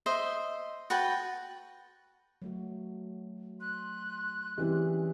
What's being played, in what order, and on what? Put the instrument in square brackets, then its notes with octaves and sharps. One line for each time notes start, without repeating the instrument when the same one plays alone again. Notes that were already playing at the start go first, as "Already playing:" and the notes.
[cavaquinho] C5 D#5 E5
F#4 B4 G5 A5
[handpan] F#3 A3 F#4
[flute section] C6 F#6
[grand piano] E3 G3 E4 [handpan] C4 C#4 G#4